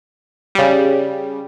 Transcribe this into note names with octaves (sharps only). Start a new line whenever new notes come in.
C#3 G3